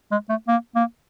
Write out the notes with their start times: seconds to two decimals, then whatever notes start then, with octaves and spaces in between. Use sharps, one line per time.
0.11 G#3
0.29 A3
0.48 A#3
0.75 A#3